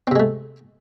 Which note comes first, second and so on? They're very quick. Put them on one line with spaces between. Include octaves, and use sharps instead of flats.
C4 C3 G#3 A3